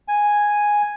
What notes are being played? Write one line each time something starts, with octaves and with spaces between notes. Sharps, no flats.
G#5